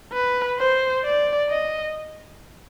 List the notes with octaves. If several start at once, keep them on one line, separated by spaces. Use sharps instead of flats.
B4
C5
D5
D#5